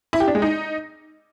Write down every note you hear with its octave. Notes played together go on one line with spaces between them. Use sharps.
E4
G4
D4
G#3
D#4